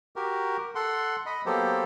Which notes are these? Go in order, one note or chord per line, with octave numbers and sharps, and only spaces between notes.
F#4 G4 A#4
A4 F#5 C6
D#5 B5
F#3 A#3 B3 G4 A4 C5